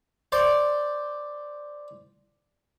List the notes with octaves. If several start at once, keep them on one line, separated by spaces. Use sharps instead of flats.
C5 D5 C6